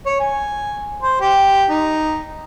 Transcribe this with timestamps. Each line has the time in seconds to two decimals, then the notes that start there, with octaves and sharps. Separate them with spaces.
0.06 C#5
0.20 G#5
1.02 C5
1.20 G4
1.69 D#4